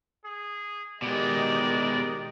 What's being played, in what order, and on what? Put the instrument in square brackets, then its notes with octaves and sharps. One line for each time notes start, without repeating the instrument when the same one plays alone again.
[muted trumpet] G#4
[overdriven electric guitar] B2 G#3 [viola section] D#3 G4 D#5 [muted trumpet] D5